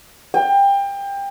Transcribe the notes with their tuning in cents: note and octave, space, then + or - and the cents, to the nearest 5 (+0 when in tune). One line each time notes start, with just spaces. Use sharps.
G5 +25